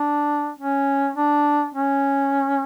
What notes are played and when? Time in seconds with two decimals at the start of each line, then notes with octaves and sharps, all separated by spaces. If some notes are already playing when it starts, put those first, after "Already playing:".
Already playing: D4
0.59 C#4
1.16 D4
1.74 C#4